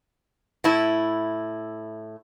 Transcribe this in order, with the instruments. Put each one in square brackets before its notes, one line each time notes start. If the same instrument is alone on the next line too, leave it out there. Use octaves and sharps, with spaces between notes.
[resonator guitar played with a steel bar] A2 E4